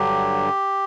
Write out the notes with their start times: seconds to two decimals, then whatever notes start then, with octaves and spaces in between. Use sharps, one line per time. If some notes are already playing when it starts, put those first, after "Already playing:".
Already playing: G2 D3 F#3 G4